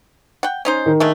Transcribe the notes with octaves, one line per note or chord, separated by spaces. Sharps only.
F#5 G5
C#4 D#4 C5
D#3
D3 G#3 A3